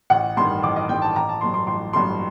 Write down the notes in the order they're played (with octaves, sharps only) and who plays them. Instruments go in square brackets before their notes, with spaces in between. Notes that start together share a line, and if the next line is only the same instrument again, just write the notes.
[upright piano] A1 F#5
G2 D#3 A3 C6
A1 D6
D#5
G2 D#3 A3 G5
A5
A1 A#5
A5
G2 F#3 A3 C6
C6
A1 C6
G2 F#3 A3 C6